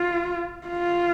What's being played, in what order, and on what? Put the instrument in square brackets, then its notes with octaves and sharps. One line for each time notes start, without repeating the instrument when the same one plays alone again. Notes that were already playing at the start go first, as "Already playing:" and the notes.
Already playing: [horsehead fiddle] F4
F4